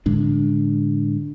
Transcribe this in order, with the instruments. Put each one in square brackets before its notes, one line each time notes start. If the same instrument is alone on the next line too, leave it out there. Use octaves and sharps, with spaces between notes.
[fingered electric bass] A2 D3 G#3 D4